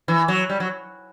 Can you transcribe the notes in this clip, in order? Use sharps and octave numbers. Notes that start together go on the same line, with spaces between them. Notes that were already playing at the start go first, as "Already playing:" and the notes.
E3
F#3
G3
F#3